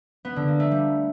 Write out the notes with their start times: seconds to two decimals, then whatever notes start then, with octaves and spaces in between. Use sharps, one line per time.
0.25 B3
0.36 D3
0.48 A#3
0.60 A3
0.71 G3